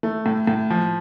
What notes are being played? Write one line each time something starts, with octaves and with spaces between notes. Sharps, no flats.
A3
A2
A2
F3